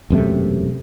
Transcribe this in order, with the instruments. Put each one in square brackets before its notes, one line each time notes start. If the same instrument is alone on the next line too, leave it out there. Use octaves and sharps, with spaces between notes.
[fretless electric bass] E1 F#2 C3 A3